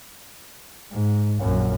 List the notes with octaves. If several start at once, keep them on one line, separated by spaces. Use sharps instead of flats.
G#2
A#1 F#2